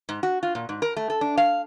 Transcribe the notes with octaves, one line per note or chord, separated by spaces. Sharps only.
G#2
F#4
F4
A#2
G#2
A#4
A3
A4
D4
F5